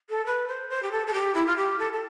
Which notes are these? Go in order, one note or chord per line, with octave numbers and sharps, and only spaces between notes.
A4
B4
C5
C5
G4
A4
A4
G4
E4
F4
G4
A4
A4